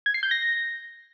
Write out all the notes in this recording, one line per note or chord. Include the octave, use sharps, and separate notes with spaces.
G#6
C7
G6
A#6